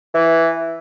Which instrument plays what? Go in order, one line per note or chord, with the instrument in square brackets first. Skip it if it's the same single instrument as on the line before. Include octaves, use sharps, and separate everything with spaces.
[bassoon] E3